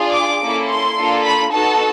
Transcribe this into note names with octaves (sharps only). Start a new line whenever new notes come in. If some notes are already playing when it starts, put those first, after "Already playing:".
Already playing: D4 F4 G#4
D6
A#3 C#4 E4 A4
C6
A#3 D4 F4 A4
B5
B3 D#4 F#4 A4 A5